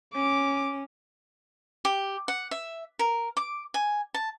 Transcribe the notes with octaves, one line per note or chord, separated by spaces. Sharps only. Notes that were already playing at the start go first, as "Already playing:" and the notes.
C#4 D6
G4
F#5
E5
A#4
D6
G#5
A5